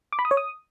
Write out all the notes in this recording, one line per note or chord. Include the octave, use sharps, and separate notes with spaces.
D6
B5
D#6
C#5
D#6